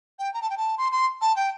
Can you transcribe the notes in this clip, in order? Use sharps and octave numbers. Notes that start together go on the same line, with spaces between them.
G5
A#5
A5
G5
A5
C6
C6
A5
G5